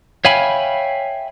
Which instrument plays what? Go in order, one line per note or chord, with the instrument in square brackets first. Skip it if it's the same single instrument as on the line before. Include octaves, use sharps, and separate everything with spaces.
[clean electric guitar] C#5 E5 F5 G5 G#5 B5